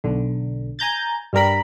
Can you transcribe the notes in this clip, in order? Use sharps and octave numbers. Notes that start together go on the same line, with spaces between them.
B1 D3
G#5 A#5 G6 A6
G2 G3 A#4 B5